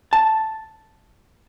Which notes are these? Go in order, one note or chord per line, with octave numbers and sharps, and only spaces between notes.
A5